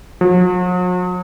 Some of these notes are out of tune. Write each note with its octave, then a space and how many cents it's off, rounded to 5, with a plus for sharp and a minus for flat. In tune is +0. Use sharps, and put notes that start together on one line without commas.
F#3 -45